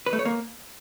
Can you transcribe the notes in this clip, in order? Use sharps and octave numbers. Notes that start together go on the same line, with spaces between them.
B4
A3
C#5
A#3